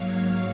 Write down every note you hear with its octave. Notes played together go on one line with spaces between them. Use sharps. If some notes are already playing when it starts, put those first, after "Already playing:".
Already playing: G#2 F#3 A#3 C#5 F5